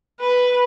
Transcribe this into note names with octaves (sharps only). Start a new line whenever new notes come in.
B4